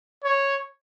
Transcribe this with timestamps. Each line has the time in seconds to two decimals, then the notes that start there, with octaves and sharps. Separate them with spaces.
0.24 C#5